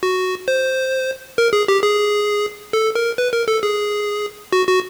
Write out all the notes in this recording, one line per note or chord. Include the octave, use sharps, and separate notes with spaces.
F#4
C5
A#4
G#4
G4
G#4
A4
A#4
B4
A#4
A4
G#4
F#4
F#4